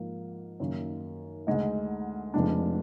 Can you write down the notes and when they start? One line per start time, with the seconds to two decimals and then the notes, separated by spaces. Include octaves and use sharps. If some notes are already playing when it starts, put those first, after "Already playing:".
Already playing: G#2 F3 A#3
0.60 F#2 D#3 A#3
1.47 D2 D3 G#3 D#4
2.34 F1 F2 F3 G#3 D4